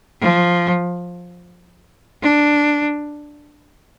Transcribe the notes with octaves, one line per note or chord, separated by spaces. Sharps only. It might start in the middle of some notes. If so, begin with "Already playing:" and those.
F3
D4